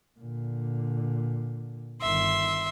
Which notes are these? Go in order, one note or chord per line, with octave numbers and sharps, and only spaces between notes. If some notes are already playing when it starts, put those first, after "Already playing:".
A#2 D3
G1 D#3 E5 C6